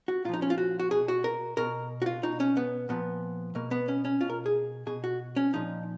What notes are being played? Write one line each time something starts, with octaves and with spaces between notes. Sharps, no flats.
F#4
A#2 F3 D#4 F4
C#4
F4
F#4
F#4
B2 G#4
F#4
A#4
B2 A#4
F#4
F4
B2 D#4
C#4
B3
A#2 F3 B3
B2 A#3
B3
C#4
C#4
B2 F4
A#4
G#4
B2 G#4
F#4
C#4
A#2 F3 D#4